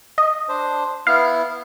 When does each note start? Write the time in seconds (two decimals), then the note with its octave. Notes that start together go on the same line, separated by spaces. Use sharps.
0.18 D#5
0.48 D4 C5
1.07 B3 E4 F5